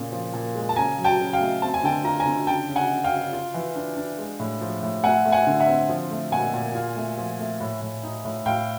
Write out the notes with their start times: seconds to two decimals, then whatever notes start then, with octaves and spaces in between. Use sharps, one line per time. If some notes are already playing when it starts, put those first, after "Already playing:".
Already playing: A#2 C#3
0.12 F3
0.34 A#2
0.55 G#3
0.69 A5
0.76 C#3 G#5 A#5
0.98 F#3
1.04 G5 A5
1.19 C#3
1.33 F5 G5
1.40 A3
1.62 C4 A5
1.74 G#5
1.83 D3 G5 A5
2.04 F4 A#5
2.20 G#5 A#5
2.26 D3
2.47 C#3 G5 A5
2.69 C#3
2.76 F#5 G#5
2.90 C#3
3.04 F5 G5
3.11 C#3
3.33 F4
3.54 E3
3.76 D4
3.97 D4
4.18 G#3
4.39 A2
4.61 F3
4.83 A2
5.04 A3 F#5 G#5
5.25 A3
5.32 F#5 G#5
5.47 D3
5.60 E5 F#5
5.67 C4
5.89 F3
6.11 A3
6.32 A#2 F#5 G#5
6.54 A#2
6.75 F4
6.96 A3
7.17 F3
7.39 A3
7.60 A2
7.81 A2
8.03 D#4
8.25 A2
8.46 A2 F5 G5